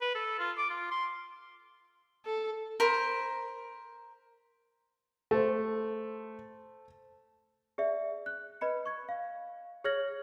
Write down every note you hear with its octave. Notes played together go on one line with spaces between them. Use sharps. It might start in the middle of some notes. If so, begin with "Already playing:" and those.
B4
A4
F4
D6
F4
C6
A4
A#4 C5 B5
A3 A4 C5
G#4 D5 E5
F#6
B4 D#5 B5 C#7
C#6 G#6
F5
G#4 C#5 F6 G#6 A#6 F#7